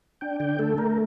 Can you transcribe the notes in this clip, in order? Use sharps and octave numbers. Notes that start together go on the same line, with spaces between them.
D4 G5
D3 G5
A3 A4
A3 A#4